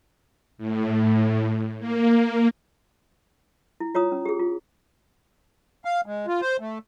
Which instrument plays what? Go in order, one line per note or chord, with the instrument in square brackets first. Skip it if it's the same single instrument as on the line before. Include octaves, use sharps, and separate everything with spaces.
[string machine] A2
A#3
[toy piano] E4
F4 C#5 A#5 D#6
C#4
G4 G#4
F4
[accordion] F5
G#3
F4
C5
A3